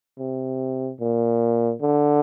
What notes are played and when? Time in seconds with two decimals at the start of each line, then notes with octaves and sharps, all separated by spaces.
0.19 C3
1.00 A#2
1.81 D3